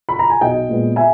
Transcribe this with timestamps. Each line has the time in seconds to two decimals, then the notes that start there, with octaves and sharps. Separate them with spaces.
0.09 B5
0.19 A#5
0.30 G#5
0.41 B1 D#5 G5
0.69 A#2 G#3 B3
0.96 E5 G#5